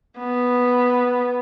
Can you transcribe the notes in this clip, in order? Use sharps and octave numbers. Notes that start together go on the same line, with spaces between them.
B3